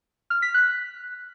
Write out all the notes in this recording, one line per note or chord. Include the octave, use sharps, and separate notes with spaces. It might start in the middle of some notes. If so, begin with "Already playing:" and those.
F6
B6
F#6